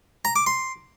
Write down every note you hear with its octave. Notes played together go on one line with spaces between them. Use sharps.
A#5
D6
C6